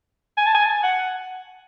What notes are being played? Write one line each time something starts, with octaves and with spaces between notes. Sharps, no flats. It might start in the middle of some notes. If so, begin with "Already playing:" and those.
G#5
A5
G#5
F#5